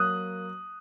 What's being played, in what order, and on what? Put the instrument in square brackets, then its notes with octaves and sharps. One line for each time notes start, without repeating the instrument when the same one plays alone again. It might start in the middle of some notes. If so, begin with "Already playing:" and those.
Already playing: [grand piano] F#3 A#3 D#6 F#6